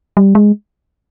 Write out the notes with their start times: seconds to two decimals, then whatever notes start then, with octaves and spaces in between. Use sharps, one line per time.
0.17 G3
0.35 G#3